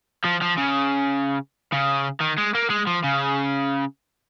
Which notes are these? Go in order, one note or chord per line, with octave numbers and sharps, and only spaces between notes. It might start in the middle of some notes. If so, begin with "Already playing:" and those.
F3
F3
C#3
C#3
D#3
G#3
A#3
G#3
F3
C#3